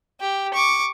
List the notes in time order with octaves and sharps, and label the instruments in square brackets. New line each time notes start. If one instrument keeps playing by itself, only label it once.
[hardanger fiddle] G4
C#6 D6